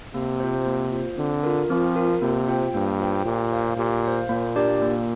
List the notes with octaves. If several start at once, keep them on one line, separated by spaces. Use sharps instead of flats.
C3 A#3
F4 C5
A#3
F4 C5
D3 C4
F4 A#4
F3 C4
F4 A#4
C3 A#3
F4 C5 G5
G2 A#3
F4 C5 G5
A#2 G4
C5 F5
A#2 G4
C5 F5
A#2 A#3
D4 G4 A#4 D5
A#3